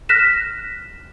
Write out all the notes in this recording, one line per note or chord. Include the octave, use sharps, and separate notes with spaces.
F6 F#6 A#6 B6 E7